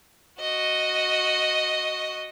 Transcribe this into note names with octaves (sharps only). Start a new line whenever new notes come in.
F#4 D#5